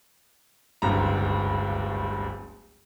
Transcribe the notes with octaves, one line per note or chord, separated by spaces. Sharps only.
D1 G1 C#2 G2 A#5